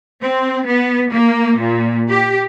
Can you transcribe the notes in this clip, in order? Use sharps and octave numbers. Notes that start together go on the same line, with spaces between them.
C4
B3
A#3
A#2
G4